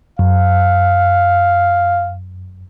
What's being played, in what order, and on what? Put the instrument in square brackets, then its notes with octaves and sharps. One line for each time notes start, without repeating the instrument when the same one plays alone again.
[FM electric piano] F#2 [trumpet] F5